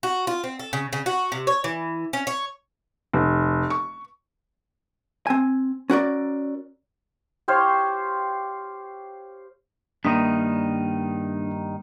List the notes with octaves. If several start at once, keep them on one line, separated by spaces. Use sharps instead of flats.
F#4
F4
C4
A4
C#3
C#3
F#4
C3
C#5
E3
C#4
C#5
F1
C#6
C4 G#5
C#4 F#4 A#4 D5
G4 C5 C#5 F5
G2 D#3 A#3 D4 D#4